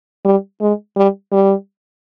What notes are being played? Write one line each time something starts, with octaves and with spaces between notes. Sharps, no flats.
G3
G#3
G3
G3